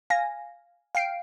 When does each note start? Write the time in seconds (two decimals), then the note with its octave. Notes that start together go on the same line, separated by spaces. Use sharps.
0.10 F5 G#5 A#6
0.95 F5 G5 C7 D7